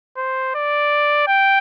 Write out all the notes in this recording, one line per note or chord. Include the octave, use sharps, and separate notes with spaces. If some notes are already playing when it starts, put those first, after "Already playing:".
C5
D5
G5